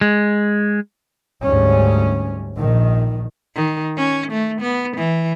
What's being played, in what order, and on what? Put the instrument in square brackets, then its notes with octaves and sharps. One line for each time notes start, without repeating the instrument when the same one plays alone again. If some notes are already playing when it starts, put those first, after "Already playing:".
[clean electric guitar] G#3
[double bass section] D2 G#2 G3 C#4
A#1 D#3
[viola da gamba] D#3
C#4
A3
B3
E3